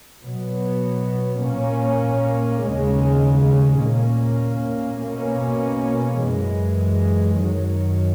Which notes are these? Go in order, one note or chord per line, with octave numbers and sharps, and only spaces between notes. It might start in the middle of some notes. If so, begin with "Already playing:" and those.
B2 F#3 B3
A#2 A#3 C#4
D#2 C#3 G#3 C#4
A#2 A#3 C#4
B2 A#3 C#4
F#2 E3 G#3
F#2 D#3 F#3